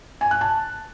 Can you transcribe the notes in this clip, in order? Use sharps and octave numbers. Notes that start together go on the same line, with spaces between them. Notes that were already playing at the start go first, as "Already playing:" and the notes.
G#5
F#6
A5